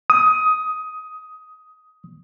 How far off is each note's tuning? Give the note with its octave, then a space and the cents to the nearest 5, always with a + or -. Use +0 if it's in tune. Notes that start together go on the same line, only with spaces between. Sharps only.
D#6 +15